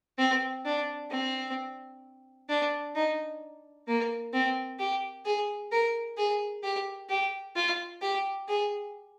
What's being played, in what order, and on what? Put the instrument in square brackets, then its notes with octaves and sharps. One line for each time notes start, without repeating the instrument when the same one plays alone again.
[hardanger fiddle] C4
D4
C4
D4
D#4
A#3
C4
G4
G#4
A#4
G#4
G4
G4
F4
G4
G#4